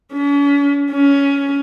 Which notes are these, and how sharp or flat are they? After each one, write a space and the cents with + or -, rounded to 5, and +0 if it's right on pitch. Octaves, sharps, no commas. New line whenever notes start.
C#4 +45
C#4 +15